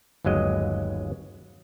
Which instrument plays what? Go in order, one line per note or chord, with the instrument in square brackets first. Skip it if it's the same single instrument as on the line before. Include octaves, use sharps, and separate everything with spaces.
[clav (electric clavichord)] G1 D#2 F#3 G#3 D#5